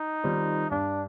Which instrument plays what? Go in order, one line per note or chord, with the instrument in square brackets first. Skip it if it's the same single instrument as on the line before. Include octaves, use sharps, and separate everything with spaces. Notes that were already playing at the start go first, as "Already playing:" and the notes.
Already playing: [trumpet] D#4
[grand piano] D#3 G3 C4 F4
[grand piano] G2 [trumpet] D4